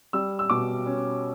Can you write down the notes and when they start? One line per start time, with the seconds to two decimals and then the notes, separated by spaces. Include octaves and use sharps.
0.13 G3 E6
0.39 E6
0.50 B2 D6
0.86 C#4